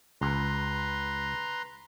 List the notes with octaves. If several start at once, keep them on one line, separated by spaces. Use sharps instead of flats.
C#2 B4 A#5 C6